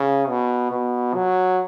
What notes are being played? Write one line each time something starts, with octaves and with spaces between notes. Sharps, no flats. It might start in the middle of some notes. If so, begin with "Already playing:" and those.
Already playing: C#3
B2
B2
F#3